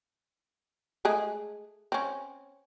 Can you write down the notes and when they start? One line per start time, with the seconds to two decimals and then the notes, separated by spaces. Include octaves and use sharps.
1.05 G#3 A3 G#4
1.92 C4 C#4